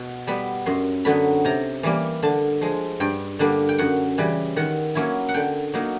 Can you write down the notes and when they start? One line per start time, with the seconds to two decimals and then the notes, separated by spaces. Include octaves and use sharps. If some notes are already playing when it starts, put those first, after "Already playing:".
Already playing: B2
0.27 G3 B3 B5
0.66 F#2 C6
1.05 D3 F#3 B3 B5
1.45 C3 A#5
1.83 E3 G3 A#3
2.23 D3 A5
2.61 F3 G#3
3.00 G2 G5
3.39 D3 G3 A#3 D4
3.69 G5
3.78 F#2 F#5
4.18 C#3 E3 G3
4.56 D#3 F#5
4.95 F#3 A#3 C#4 E4
5.29 F#5
5.34 D3 G5
5.74 F#3 A#3 D#4